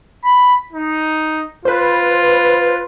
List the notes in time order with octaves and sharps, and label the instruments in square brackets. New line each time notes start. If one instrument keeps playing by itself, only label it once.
[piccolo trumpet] B5
D#4
[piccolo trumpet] F4 [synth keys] B4 C5